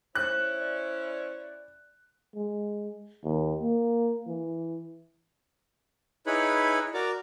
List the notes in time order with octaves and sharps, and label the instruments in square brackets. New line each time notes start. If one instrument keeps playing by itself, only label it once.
[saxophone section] C#4 E4 [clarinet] C5 [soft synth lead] C#5 [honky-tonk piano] F#6
[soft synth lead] D5
[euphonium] G#3
D#2
A#3
E3
[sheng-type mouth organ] D#4 E4 G#4 B4 C#5 B5
F#4 A#4 D5 D6